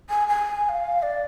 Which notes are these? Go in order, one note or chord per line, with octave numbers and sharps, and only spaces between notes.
G#5
G#5
G#5
F5
D5